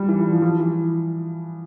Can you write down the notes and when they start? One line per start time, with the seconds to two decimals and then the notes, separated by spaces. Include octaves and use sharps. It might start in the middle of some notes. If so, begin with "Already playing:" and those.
Already playing: G3
0.09 E3
0.19 E3
0.31 F3
0.42 F3
0.60 E3